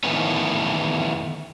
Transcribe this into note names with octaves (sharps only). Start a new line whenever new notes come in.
D#3 E3 A3 B3 C#4